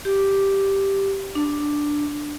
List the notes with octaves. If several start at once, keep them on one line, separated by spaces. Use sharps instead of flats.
G4
D4